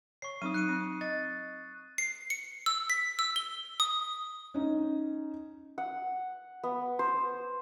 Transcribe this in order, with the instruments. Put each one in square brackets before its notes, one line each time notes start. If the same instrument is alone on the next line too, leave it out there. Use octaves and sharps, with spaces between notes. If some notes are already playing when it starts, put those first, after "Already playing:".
[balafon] C#5 [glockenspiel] C#6 C7
[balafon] F#3 C4 D#4 [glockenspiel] D#6 D#7
[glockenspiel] F#6 C#7 D#7
[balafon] C4
[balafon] D#5 [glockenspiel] A6
[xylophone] C7
C#7
E6
B6
E6
G7
D#6
[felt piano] C#4 D#4
[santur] F#5
B3
C5